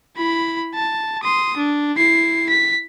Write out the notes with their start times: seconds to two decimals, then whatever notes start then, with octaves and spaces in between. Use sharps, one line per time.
0.16 E4 B5
0.74 A5
1.23 C6 D#6
1.57 D4
1.97 E4 C7
2.49 B6